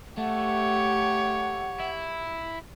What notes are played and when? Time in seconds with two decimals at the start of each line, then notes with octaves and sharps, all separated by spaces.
0.17 A3 G4 C#5 F#5
1.80 E4